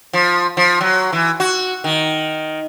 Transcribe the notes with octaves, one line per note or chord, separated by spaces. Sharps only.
F3
F3
F#3
E3
F#4
D#3